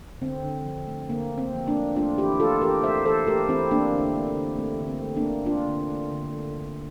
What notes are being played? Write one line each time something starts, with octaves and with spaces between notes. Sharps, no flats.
D3 C4
D3
F3
A3
D3 A#3
D3
C4
F3
A#3 D4
A3
A3 D4 F4
E3 E4 G4
A3 F4 A4
E3 G4 A#4
A3 C5 E5
E3 A4 C5
A3 G4 A#4
E3 C4 E4
A3 A#3 D4
D3
A3
D3
A3 C4
D3
C4
A3
A#3 D4
D3
A3 D4 F4
D3
A3
D3
A3
D3